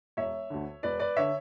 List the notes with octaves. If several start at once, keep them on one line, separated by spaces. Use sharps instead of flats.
E1 C#5 E5
D2 D3
E1 B4 D5
B4 D5
D3 C#5 E5